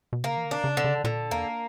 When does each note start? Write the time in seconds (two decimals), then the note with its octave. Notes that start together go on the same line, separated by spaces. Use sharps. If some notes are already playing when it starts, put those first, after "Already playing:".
0.13 B2
0.24 C#3 A#3
0.37 E3
0.45 D3
0.51 D4
0.64 C#3
0.77 D3
0.84 C#3
1.04 A#2 D3
1.31 E2 A#3